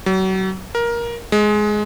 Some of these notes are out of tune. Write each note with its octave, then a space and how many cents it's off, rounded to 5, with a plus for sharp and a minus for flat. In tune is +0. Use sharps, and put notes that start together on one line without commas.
F#3 +35
A#4 +15
G#3 +15